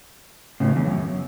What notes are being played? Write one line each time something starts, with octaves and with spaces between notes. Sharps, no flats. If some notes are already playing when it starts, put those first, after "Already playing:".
A2 C#3
E2
E2
F#2